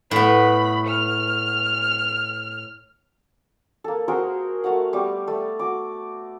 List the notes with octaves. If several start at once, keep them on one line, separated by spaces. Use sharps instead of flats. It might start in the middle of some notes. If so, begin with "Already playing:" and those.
A2 B3 B5
F6
A#3 A4
F#4 G#4 A#4 C5
A3 F#4 F5 F#5
G3 B3 C#6 D6
A3
F#4 D6